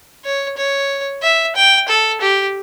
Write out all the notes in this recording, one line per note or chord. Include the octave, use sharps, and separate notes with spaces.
C#5
C#5
E5
G5
A4
G4